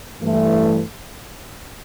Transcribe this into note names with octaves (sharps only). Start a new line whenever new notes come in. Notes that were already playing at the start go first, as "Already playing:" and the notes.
G2 E3 A3